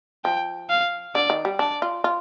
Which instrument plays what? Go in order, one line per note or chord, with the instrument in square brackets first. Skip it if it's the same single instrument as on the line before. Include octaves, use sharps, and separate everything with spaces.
[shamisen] F3 [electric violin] G5
[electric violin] F5
[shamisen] D3 [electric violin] D5
[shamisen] D#3
G3
[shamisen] D4 [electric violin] D5
[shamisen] F4
F4